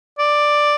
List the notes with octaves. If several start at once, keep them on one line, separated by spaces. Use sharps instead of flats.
D5